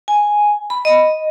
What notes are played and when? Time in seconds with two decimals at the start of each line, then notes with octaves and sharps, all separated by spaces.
0.08 G#5
0.70 B5
0.85 D#5